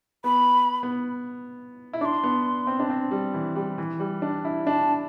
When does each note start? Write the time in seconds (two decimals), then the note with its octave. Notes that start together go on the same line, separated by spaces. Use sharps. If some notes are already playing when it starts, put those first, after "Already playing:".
0.24 B3 B5
0.83 B3
1.93 E4
2.01 D4 D6
2.05 C6
2.24 B3
2.67 C4
2.80 D4
2.90 C4
3.11 G3
3.34 E3
3.56 G3
3.78 E3
4.00 G3
4.22 D4
4.45 E4
4.66 D4 A5